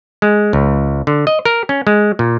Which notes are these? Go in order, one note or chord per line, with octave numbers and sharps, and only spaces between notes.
G#3
C#2
D3
D#5
A#4
C#4
G#3
A#2